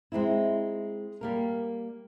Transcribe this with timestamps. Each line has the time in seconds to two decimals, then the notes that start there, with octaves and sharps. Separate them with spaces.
0.12 G#3 C4 D#4 E4
1.21 G3 A#3 A#4